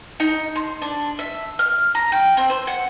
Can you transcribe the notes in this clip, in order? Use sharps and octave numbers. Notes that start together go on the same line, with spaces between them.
D#4
C6
D4
E5
F6
A#5
G5
C4
C5
F#5